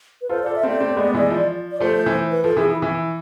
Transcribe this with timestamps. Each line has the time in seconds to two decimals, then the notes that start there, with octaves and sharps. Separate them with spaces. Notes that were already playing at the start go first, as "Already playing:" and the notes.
0.22 B4
0.29 F4 A4 C5
0.43 F4 A4 D5
0.55 E5
0.63 A3 C4 D5
0.80 A3 C4
0.97 G#3 B3
1.14 E3 G#3
1.30 F3
1.71 D5
1.80 F3 A3 C5
2.06 E3
2.31 B4
2.44 F3 A4
2.56 E3 G#4
2.68 E4
2.82 E3